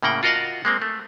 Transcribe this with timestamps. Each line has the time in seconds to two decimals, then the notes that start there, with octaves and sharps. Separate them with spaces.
0.03 A2 C#3 A#3 F#5 G5
0.23 F4 F#4 A#4 D#5 F5 F#5
0.65 G#3 A#3 C4
0.82 A3